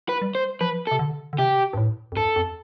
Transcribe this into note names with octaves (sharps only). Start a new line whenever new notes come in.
B4
G3
C5
F3 B4
A4
C3
D3
D3
C3 G4
G2
A2
F2
G2 A4
F2